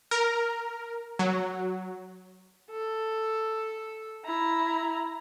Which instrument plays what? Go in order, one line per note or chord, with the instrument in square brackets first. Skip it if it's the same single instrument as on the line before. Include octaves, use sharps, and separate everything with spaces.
[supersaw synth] A#4
F#3
[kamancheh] A4
E4 A#5